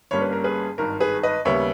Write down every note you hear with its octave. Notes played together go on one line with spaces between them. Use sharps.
G1 G2 G3 A#3 C#4 C#5
B4
A#4
G#4 B4
G#1 G2 D#3 A#4
G#4 B4
B4 D#5
D#2 C#3 G3 B3 C#5 E5